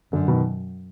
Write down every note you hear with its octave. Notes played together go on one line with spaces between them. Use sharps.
F#2 D3
B2 D#3